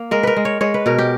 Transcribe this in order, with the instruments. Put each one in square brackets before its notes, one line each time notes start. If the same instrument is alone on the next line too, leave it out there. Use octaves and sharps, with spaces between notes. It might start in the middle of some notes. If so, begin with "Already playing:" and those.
Already playing: [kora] A#3
G#3 A#4
A#4 B4
G#3
C#5
G#3 C#5
B4
B2 A#4
G4